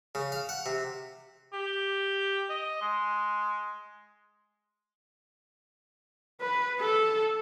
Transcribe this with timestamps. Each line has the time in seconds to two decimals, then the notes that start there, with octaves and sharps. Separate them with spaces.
0.15 C#3
0.32 F5
0.49 F#5
0.66 C3
1.53 G4
2.50 D#5
2.81 G#3
6.41 B4
6.80 A4